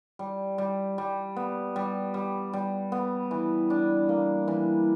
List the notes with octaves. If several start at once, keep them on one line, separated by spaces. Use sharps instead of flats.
G3
G3
G3
B3
G3
G3
G3
B3
E3
D4
A#3
E3